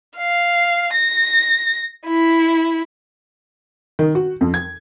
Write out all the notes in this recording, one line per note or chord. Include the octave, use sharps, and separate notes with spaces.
F5
A#6
E4
D#3
F#4
F2
G#6